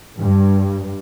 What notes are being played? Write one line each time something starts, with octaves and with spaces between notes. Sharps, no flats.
G2